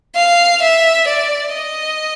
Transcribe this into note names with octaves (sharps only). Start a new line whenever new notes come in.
F5
E5
D5
D#5